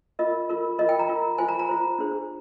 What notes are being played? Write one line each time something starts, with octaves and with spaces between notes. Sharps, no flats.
F4 A#4 D#5
F4 A#4
F4 A#4 D#5
G5
A#5
F4 A#4
F4 C5 G#5
A#5
A#5
F4 C5
D4 G#4 C5